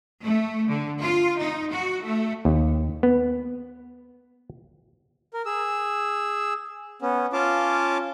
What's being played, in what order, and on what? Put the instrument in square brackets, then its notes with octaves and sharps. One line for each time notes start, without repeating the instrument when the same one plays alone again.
[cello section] A3
D3
F4
D#4
F#4
A3
[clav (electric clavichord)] D#2
B3
[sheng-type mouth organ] A#4
G#4 E6
B3 C#4
C#4 F4 F5 A5 D6